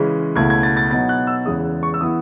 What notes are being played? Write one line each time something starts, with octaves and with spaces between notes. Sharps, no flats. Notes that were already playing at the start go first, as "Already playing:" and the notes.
Already playing: C#3 E3 G#3 C#4
C#2 B2 A3 E4 G#6
G#6
A6
A6
B2 F#3 B3 D#4 A6
F#6
E6
E2 C#3 E3 G#3 D#6
C#6
E6
E3 B3 E4 D#6